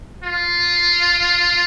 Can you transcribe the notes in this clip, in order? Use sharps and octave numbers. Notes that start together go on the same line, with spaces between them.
F4